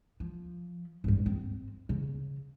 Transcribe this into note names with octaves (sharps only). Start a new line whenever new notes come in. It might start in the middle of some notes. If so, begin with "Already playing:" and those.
F3
G#1 G2
C4
C#3